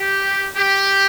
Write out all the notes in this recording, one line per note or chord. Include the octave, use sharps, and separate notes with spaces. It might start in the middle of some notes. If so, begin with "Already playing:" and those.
Already playing: G4
G4